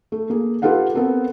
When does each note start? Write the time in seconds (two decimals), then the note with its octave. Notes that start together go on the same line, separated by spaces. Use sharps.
0.12 A3
0.30 A#3 G#4
0.62 F4 G4 A4 B4 F5 F#5
0.95 B3 C4 A4 A#4